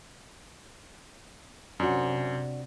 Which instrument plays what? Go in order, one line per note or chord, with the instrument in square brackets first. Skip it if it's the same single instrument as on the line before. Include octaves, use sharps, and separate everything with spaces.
[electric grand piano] F#2 [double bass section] C3 [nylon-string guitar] D4 F#4